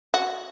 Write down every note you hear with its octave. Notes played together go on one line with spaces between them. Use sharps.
F#4